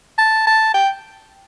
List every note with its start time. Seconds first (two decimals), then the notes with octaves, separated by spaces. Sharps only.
0.18 A5
0.47 A5
0.74 G5